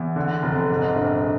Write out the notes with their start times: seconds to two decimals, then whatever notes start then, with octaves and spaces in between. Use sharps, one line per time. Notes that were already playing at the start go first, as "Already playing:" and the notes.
Already playing: E2
0.16 D3
0.43 F1
0.70 G#2
0.96 A#1